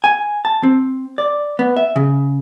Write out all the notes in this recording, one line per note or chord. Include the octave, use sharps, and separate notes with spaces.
G#5
A5
C4
D5
B3
E5
C#3